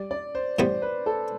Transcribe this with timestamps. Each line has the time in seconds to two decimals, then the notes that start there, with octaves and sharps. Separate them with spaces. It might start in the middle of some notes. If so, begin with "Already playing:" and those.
Already playing: G3 D5
0.11 D5
0.35 C5
0.58 A2 E3 G3 B3 C5
0.82 B4
1.06 A4